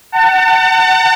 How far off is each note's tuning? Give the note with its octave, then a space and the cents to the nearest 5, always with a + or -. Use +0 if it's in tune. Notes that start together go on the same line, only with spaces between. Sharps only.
F#5 +20 A5 +40